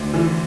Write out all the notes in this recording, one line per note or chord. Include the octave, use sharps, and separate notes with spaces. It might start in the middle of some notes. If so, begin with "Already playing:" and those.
Already playing: D2 C5
E3